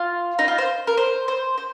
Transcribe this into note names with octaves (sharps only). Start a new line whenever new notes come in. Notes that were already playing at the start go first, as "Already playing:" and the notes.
Already playing: F4
D#4
F4
C5
A#4
C5
C5
C5